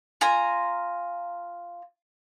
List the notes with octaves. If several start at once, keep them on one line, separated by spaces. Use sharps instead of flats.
F4 G#5 A#5